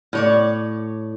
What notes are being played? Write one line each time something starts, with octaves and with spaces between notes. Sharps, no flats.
A2 C#5 D5